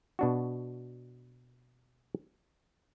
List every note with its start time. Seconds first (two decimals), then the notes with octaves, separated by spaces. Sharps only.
0.19 B2 D4 F#4